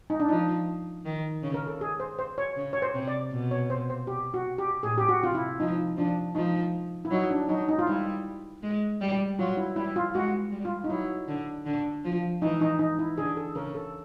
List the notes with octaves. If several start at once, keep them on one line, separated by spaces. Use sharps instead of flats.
D#4
D4
F3 D#4
D#3
C#3
A#4
A4
G#4
C5
C5
C#5
C#3
C#5
C5
C3
D5
B2
C#5
C5
C5
G4
F#4
G4
A2 G#4
G4
F#4
C3 F4
E4
F3 D#4
F3 D4
F3 D#4
E4
F#3 D#4
D4
F#3 D#4
D#4
F4
G3 E4
G#3
G3
F#3 F4
E4
G3 E4
F4
G#3 F#4
G3
F4
D#4
F#3 E4
D3
D3
F3
E3 D#4
D#4
D#4
E4
D3 G#4
A4
C#3 A#4
A4